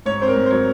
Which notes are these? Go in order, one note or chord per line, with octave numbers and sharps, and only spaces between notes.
G#2 C#5
C4 C5
A#4
G#2
C5
F#3 C#5